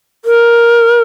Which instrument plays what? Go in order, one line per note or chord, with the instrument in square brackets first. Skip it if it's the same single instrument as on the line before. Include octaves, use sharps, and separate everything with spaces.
[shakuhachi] A#4